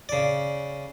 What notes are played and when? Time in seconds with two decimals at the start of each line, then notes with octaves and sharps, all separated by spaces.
0.09 C#3 D5